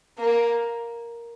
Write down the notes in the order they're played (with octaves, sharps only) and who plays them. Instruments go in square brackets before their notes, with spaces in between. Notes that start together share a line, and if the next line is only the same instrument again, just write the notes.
[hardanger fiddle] A#3